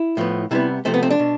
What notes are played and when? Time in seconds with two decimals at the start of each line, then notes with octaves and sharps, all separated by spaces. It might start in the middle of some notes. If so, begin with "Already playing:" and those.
Already playing: E4
0.17 A2 F3 B3
0.51 C3 G3 B3 E4
0.85 C3 F3 A3 C4
0.94 B3
1.03 C4
1.10 D4
1.19 B2